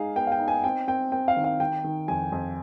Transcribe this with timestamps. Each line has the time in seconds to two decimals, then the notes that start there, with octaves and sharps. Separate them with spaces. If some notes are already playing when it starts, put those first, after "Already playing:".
Already playing: G#3 D#4 G#4 F5
0.16 B3 G5
0.27 F5
0.32 G5
0.40 D#4
0.48 G#5
0.64 C4 G5
0.88 C4 G5
1.12 C4 G5
1.28 F5
1.37 D#3
1.44 F5
1.60 D#3 G5
1.84 D#3
2.08 F2 G#5
2.32 F2